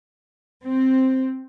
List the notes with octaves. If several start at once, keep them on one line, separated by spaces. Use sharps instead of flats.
C4